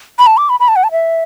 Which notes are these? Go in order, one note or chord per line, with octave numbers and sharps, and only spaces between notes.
B5
A5
D6
B5
B5
A5
F#5
A5
E5